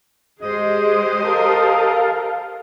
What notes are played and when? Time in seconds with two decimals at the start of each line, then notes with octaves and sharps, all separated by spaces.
0.42 G#3 G4 G#4 C5 D#5
1.25 A4 A#4 F5